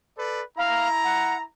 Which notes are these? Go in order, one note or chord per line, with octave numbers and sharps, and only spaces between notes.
A4 B4 D5
E4 F5 A#5
F#5